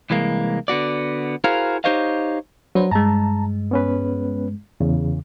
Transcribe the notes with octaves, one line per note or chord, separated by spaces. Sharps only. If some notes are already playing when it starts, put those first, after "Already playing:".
C2 E3 G#3 A#3
D3 B3 F#4 D5
E4 F#4 G#4 A#4 C5 F5
D#4 G4 C5 C#5 D#5 F5
F#3 D4 B4 C5
G2 G#3 A5 A#5
B3 C#4 B4
E2 C#3